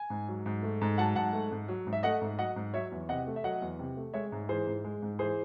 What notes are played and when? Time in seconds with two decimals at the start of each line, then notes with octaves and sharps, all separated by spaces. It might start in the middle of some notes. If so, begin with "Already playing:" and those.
Already playing: G#5
0.10 G#2
0.28 F#3
0.46 G#2
0.63 A3
0.81 G#2
0.98 F#3 F#5 A5
1.16 G#2 F#5 A5
1.33 A3
1.51 G#2
1.68 F#3
1.87 G#2
1.93 E5
2.03 A3 D#5 F#5
2.21 G#2
2.38 F#3 D#5 F#5
2.56 G#2
2.74 F#3 C#5 E5
2.91 E2
3.09 C3 D#5 F#5
3.27 A3
3.36 E5
3.44 F#3 D#5 F#5
3.61 E2
3.79 C3
3.97 A3
4.14 G#3 C#5 E5
4.32 G#2
4.49 E3 G#4 C5
4.67 G#2
4.84 G#3
5.02 G#2
5.19 E3 G#4 C5